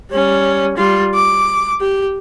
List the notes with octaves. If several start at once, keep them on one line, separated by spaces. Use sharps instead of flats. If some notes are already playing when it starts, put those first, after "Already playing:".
G3 C#4
G3 F4
D6
G4